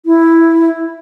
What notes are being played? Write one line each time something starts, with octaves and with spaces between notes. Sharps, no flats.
E4